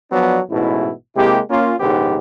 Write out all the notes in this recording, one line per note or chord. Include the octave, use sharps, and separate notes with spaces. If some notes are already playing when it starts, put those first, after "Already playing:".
F3 F#3 B3 D4
A1 G#2 B2 E4
C3 G#3 A#3 E4 G4
A#3 C#4 F4
A#1 D#2 G#2 C#3 B3 G4